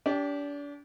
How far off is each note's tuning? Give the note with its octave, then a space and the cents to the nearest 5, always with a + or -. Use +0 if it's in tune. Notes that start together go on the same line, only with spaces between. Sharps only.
D4 -35 G4 +0